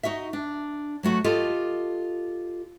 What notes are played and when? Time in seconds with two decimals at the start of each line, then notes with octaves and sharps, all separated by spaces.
0.03 D#4 F#4 D#5 E5
0.33 D4
1.03 F#3 A3 F#4
1.24 F4 G4 A4 D#5